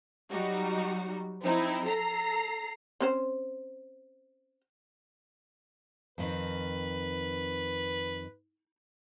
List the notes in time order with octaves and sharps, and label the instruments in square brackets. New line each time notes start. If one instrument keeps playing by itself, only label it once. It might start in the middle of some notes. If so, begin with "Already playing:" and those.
[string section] F#3 G3 D#4 F#4
F3 C4 D#4 E4
A4 A#5 C7
[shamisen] C4 C#4 C5
[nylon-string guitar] F2 D#3 C4 [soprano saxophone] B4